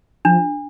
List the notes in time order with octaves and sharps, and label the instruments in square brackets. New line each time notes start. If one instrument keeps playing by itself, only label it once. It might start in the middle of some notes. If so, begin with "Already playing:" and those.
[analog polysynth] F3 [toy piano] D4